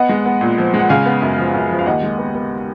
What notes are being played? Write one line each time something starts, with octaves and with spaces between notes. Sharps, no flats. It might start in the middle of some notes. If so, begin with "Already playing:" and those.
Already playing: B3 D#5 F#5
G#3
B3
A#2
F3
G#3
F#5
C#3 F5 G#5
B3
F#2
F3
F#2
F3
F5
D#2 D#5 F#5
G#3
B3
B3